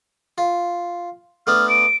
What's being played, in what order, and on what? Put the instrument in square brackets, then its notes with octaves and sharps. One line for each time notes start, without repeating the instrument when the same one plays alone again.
[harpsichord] F4
[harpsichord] A3 B3 D4 [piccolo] F6
[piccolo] D7